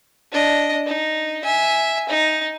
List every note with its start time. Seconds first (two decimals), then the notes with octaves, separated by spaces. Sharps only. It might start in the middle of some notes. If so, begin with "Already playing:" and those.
0.32 D4 D#5
0.86 D#4
1.43 E5 G#5
2.09 D#4